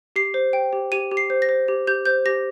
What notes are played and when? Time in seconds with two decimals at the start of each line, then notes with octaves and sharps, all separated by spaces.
0.16 G4 C7
0.34 C5
0.53 G5
0.73 G4
0.92 G4 D#7
1.11 G4
1.17 C7
1.30 C5
1.42 A#6
1.49 C5
1.68 G4
1.87 G4 G6
2.05 C5 G6
2.26 G4 A#6